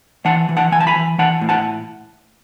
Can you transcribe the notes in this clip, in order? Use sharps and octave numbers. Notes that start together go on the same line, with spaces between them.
E3 F#5 A5
E3
F#5 A5
E3 G#5
A5
G#5 B5
E3
E3 F#5 A5
A2
F#5 A5